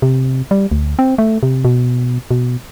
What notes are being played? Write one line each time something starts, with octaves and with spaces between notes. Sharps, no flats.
C3
G3
D2
C4
A3
C3
B2
B2